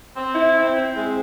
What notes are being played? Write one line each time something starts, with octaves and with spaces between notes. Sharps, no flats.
C4
E4
C4
C4
G#3